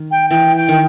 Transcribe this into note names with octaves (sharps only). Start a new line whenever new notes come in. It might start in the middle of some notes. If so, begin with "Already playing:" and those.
Already playing: D#3
G5
E3 G5
G5
D#3